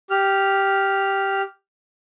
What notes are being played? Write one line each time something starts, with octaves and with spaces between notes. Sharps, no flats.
G4 F6